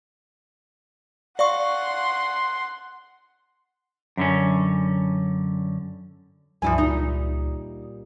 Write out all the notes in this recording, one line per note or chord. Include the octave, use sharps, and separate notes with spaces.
D5 F5 F#5 C6 C#6
F#2 D3 C#4
C#2 G2 F3 E4 F#4 G#5
A#2 G3 D#4